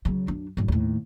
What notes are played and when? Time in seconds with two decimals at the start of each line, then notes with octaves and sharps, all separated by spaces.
0.05 C#3 F#3
0.27 F#2 D4
0.57 G#1 G2
0.68 D#2 A2